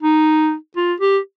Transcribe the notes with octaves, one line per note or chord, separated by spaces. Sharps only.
D#4
F4
G4